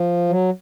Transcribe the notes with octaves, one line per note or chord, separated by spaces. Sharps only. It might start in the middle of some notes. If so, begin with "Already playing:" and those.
Already playing: F3
F#3